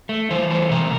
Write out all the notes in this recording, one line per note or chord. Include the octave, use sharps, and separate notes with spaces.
A3
E3 C5
A3 C5
C3 A#4